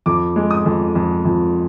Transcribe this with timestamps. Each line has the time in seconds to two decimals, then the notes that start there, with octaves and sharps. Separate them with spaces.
0.06 F2 D6
0.36 G#3
0.51 D#6
0.66 F2
0.95 F2
1.25 F2